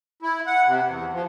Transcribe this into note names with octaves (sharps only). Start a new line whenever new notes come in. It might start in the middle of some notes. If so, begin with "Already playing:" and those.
E4
F#5
C3
E2
F3